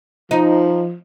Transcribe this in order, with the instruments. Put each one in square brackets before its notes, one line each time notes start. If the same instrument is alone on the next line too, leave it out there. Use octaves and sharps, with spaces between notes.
[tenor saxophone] F3 [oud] D#4